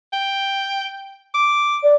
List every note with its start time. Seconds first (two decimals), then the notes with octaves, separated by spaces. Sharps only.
0.13 G5
1.34 D6
1.83 D5